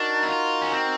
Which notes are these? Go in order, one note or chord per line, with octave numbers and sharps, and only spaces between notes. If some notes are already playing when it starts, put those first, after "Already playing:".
Already playing: D4 D#4 F#4 A#4
E4
F4
C#4
C4